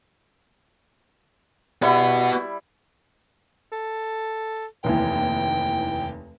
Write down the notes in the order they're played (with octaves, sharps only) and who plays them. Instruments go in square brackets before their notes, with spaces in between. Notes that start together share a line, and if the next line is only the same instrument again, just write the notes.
[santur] G3 E4 [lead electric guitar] B3 F#4
[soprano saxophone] A4
[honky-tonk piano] F1 D#2 E3 [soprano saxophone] G5